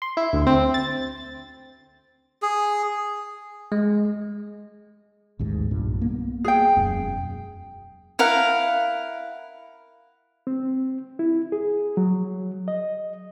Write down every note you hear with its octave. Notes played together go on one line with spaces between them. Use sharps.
C6
E4
D2
C4
A6
G#4
G#3
A1 D#2 G#2
B1 G2 A#2
A#3 B3
G#4 G5
E1 F#2
E4 A#4 F5 F#5
C4
E4
G#4
F#3
D#5